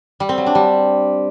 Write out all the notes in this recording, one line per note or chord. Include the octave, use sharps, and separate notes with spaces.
G3
C4
F#3
D4
G3